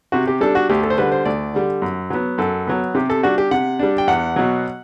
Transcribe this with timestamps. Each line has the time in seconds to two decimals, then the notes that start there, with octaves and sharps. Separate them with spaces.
0.12 C3 F#4
0.27 G4
0.41 G3 D4 A4
0.55 F#4
0.69 D2 G4
0.83 A4
0.90 C5
0.98 D3 G3 B4
1.12 C5
1.25 D2 D5
1.54 D3 G3
1.82 F#2
2.10 F#3 B3
2.38 F#2 A4
2.67 F#3 B3
2.95 C3 G4
3.10 A4
3.23 G3 D4 F#4
3.38 G4
3.51 C3 F#5
3.79 G3 D4
3.98 G5
4.07 E2 F#5
4.36 B2 F#3